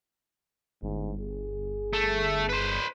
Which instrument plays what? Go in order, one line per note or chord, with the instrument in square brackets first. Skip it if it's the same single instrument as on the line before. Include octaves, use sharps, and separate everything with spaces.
[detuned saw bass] G1 [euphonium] G#2
[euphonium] G#4
[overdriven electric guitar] A3
B4 C5